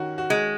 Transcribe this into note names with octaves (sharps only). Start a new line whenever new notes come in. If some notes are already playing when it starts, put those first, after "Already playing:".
Already playing: D#3 C#4 F#4
F#4
G#3